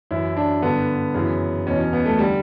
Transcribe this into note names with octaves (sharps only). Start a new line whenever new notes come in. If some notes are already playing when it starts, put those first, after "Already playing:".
F#2 E3 E4
D4
G2 D3 B3
F#2 C#3 E3
E2 B2 C#4
C#4
B3
A3
D3 G3